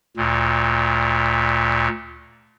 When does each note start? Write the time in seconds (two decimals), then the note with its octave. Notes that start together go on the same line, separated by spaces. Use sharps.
0.17 D2 A#2